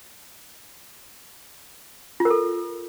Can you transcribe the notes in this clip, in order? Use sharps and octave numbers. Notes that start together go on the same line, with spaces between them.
F4
A#4
A4